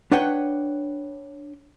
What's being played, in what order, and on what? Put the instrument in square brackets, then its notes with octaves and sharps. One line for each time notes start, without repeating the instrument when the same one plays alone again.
[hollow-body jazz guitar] D4 B4 C#5 F#5 G5